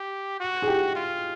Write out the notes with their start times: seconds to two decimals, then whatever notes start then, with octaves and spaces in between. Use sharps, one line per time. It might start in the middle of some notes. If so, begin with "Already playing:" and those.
Already playing: G4
0.40 F#4
0.62 G#4
0.67 G4
0.95 F4